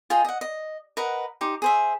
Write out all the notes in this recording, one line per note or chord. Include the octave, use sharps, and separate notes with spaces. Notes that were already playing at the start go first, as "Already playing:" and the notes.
F4 G#4 D#5 G5
D#5 F#5
D#5
A#4 B4 D#5 F#5
D#4 G4 C6
G#4 C5 E5